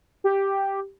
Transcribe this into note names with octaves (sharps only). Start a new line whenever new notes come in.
G4